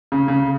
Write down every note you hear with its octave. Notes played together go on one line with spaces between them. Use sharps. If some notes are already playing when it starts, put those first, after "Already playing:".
C#3
C#3